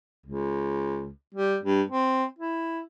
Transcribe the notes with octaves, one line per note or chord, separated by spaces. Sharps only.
C#2
G3
G2
C4
E4